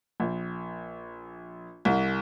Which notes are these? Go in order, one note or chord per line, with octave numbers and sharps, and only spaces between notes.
A#1
C2